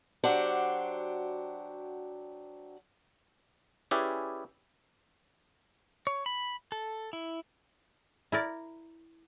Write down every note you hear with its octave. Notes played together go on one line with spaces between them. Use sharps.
F#3 D4 F#4 G4 C5
C#4 E4 G4 G#4 B4 D5
C#5
B5
A4
E4
E4 A#4 D5